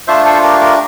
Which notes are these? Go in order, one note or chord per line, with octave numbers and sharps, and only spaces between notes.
A3 D4 F4 C5 E5
A4 C5
G4 A#4
G4 A#4